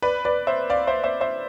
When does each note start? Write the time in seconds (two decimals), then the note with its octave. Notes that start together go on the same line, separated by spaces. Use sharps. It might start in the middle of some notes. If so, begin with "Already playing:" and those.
0.02 B4 D5
0.25 B4 D5
0.47 C5 E5
0.70 D5 F5
0.87 C5 E5
1.04 C5 E5
1.21 C5 E5